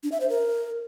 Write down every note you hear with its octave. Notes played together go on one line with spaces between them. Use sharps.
D4
E5
C5
A#4